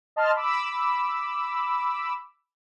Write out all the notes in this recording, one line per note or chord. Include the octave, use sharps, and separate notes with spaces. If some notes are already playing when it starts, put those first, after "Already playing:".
D#5 A5 C6 F6
B5 D6 E6